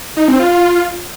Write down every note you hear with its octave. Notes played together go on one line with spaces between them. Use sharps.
D#4
C4
F4